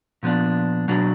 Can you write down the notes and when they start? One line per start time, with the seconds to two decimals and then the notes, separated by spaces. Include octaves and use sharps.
0.23 A#2 F3 B3 D4
0.88 B2 F#3 D4 F#4